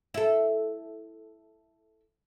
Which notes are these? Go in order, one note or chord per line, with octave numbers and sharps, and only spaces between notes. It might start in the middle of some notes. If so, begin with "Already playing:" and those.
E4 A4